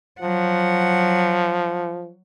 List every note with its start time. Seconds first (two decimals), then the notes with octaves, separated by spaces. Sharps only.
0.21 F3 F#3 F#5